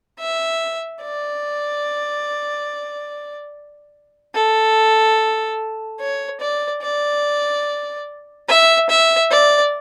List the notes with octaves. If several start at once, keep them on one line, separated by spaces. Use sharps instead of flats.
E5
D5
A4
C#5
D5
D5
E5
E5
D5